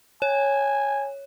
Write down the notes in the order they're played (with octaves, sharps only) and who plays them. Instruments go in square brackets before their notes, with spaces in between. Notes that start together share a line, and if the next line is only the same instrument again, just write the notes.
[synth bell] C#5 [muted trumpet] G#5